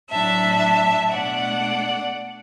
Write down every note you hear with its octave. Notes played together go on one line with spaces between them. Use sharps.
A2 F#3 D4 E5 A5
B2 A3 D4 D5 F#5